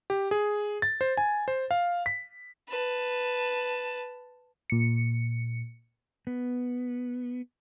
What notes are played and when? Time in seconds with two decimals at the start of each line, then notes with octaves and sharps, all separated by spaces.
0.10 G4
0.31 G#4
0.82 A6
1.01 C5
1.17 G#5
1.48 C5
1.71 F5
2.06 B6
2.68 B4 A5
4.70 A#2 C#7
6.27 B3